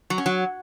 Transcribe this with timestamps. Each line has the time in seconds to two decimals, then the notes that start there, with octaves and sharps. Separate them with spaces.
0.10 F#3
0.18 C#4
0.26 F#3